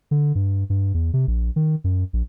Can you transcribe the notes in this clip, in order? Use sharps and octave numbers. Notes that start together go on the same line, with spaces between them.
D3
G2
G2
E2
C3
A#1
D#3
F#2
A#1